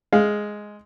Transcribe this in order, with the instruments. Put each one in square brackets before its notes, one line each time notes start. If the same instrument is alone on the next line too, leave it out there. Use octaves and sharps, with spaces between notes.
[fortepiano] G#3 F5